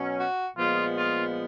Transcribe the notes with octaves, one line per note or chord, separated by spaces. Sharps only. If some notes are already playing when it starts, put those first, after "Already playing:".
Already playing: B2 F#3 C#4
F#4
A#2 F3 G#3 B3 F4
F4